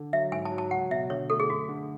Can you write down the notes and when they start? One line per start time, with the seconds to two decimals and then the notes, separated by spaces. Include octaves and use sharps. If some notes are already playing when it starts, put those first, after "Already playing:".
Already playing: D3
0.13 F#3 E5
0.31 G#2 G#5
0.45 A5
0.51 F#3
0.58 A5
0.71 C#2 F#5
0.91 B2 E5
1.10 D3 C#5
1.30 A3 A4
1.40 G#4
1.49 F#2 F#4
1.69 D3